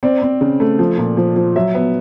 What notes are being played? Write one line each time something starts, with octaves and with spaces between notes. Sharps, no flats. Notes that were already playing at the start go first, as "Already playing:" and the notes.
C4 D5
C4
C#3
A3
F3
A#2
F3
F3
F#3 E5
B3